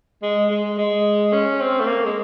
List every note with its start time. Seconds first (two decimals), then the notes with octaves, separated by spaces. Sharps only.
0.23 G#3
0.50 G#3
0.78 G#3
1.33 C#4
1.61 C4
1.80 A3
1.87 A#3
2.06 G#3